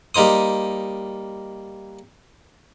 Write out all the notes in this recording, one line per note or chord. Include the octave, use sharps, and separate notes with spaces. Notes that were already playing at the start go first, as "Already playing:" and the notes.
G3 A#3 D#4 C5 D#6